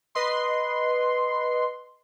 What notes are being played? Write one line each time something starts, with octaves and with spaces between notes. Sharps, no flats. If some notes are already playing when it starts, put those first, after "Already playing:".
B4 D#5 C6